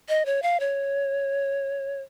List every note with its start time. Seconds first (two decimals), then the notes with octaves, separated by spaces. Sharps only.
0.09 D#5
0.26 C#5
0.42 F5
0.60 C#5